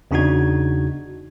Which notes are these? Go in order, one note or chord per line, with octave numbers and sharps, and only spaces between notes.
E2 C#3 D4 D#4 F#4 G#6